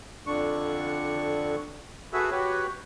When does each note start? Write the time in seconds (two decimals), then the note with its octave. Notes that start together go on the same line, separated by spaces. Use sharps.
0.27 F2 D3 D4 C#6
2.13 F#4 G#4 A4 B4 E5 E6
2.31 F#4 G4 B4 C#5